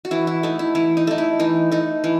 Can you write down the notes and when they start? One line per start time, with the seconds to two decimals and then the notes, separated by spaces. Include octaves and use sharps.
0.05 F#4
0.11 E3 E4
0.27 E4
0.43 A3 D#4
0.59 E4
0.75 E3 E4
0.97 D#4
1.07 A3 D#4
1.18 E4
1.39 E3 D#4
1.72 A3 D#4
2.04 E3